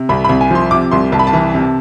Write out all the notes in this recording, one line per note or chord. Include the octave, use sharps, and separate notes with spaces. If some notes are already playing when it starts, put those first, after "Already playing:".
Already playing: C3
C2 B5
C2 B5
G#5
F3 C6
C3 D6
C2 C6
C2 A5
B5
A5
E3
C3